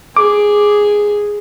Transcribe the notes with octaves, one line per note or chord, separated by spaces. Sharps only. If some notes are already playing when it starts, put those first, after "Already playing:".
G#4 D6